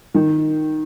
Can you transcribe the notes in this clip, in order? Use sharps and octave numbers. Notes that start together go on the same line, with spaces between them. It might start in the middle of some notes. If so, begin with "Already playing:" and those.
D#3